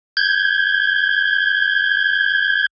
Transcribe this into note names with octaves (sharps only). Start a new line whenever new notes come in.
G6 G#6